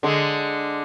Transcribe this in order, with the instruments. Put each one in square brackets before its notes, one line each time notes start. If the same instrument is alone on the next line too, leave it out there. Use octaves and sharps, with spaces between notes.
[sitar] D3 G#3